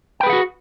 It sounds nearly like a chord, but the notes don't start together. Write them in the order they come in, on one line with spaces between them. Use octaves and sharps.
G5 B4 G#4 F#5 F#4